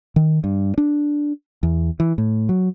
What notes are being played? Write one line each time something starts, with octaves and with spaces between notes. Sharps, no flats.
D#3
G2
D4
E2
E3
A2
F#3